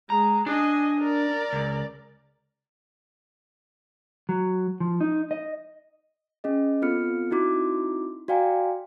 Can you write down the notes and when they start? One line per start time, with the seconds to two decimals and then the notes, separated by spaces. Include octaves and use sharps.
0.10 G#3 A#5
0.46 D4 D#5 G#5
1.00 A#4 D5
1.53 C#2
4.29 F#3
4.80 F3
5.01 D#4
5.31 D#5
6.44 C#4 G#4 D#5
6.82 B3 C4 F4 A4 F6 C#7
7.31 C4 D#4 E4 F#4 D6
8.28 F#4 D5 F5 G5 G#5 A#5